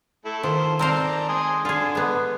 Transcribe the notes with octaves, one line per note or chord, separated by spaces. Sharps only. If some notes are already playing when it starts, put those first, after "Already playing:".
A3 E4 A4
D#3 F4 A4 C5
C4 A#4 C5 D5 A5 A#5
G#5 C6 D#6
D3 F4 G#4
G#3 B3